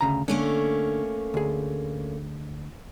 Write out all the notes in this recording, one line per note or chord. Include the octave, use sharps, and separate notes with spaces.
D2 C#3 A#5
D3 A3 A#3 C#4
D2 G#4